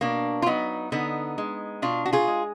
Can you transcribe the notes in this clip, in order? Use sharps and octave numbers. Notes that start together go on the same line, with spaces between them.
B2 A#3 D4
F4
F#3 B3 D#4
D3 B3 D#4
G#3
B2 D4 F4
F#4
F4 G#4
G#3